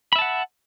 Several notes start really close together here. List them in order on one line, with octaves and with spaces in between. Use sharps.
B5 E5 A5 F#5